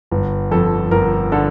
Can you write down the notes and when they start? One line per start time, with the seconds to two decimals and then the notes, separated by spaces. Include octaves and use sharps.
0.12 G1
0.51 F2 A4
0.91 G1 A#4
1.32 D3 A4